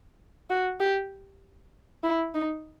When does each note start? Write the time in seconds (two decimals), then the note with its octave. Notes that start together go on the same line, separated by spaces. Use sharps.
0.50 F#4
0.80 G4
2.04 E4
2.34 D#4